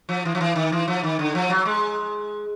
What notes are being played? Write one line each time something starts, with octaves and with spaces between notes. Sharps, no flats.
F3
E3
F3
E3
D#3
E3
F3
D#3
D3
F3
F#3
G#3